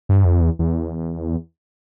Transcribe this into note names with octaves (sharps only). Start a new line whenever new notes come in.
G2
F2
E2
E2